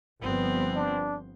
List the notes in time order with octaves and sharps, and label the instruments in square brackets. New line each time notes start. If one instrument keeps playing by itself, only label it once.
[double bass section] G1 F3 B3 [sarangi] C4
[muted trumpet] D4